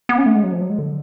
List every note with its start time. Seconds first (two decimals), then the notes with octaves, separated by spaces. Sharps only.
0.09 B3
0.18 C#4
0.26 A3
0.36 G#3
0.44 F#3
0.52 F3
0.61 F#3
0.70 G#3
0.79 D3